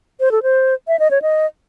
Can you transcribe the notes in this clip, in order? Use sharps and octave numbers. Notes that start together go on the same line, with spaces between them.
C5
A4
C5
E5
D#5
C#5
D#5